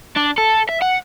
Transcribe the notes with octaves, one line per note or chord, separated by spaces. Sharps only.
D4
A4
E5
F#5